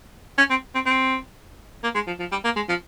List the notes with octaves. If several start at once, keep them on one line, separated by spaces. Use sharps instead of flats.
C#4
C4
C4
C4
A#3
G#3
F3
F3
G3
A#3
G#3
F3